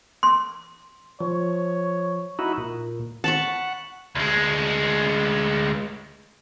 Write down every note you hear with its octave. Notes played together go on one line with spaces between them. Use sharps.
C6
F3 C#5
D#4 E4 F#4
A#2
F#5 A5 B5 C#6
D2 G#3